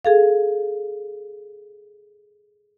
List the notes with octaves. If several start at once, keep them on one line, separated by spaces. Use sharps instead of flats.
G#4 A4 F5